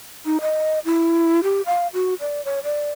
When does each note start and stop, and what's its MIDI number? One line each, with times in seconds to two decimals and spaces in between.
0.26 0.41 63
0.41 0.79 75
0.85 1.40 64
1.44 1.61 67
1.66 1.87 77
1.94 2.14 66
2.20 2.44 74
2.45 2.60 73
2.64 2.91 74